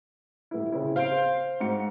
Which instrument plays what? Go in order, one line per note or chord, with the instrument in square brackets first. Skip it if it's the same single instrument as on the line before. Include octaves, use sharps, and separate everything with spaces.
[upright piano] D#1 E4
C#3 C4 E4
[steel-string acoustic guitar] C5 F5 [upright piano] F6 D7
[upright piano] G#2 F#4 C#7